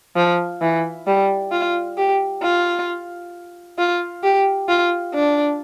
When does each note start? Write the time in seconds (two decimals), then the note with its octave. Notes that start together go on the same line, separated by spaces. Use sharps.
0.16 F3
0.61 E3
1.07 G3
1.52 F4
1.98 G4
2.42 F4
3.78 F4
4.23 G4
4.69 F4
5.14 D4